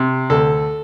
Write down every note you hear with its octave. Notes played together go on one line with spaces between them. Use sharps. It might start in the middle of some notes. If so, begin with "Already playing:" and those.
Already playing: C3
D2 A4